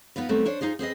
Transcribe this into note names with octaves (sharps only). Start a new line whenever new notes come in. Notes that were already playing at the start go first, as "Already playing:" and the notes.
B3 D#4 F4 B4
D#3 F#3 G3 A3 B3 C4
D4 C5 C#5
D#4 F4 G#4 C5
C4 G#4 B4 D#5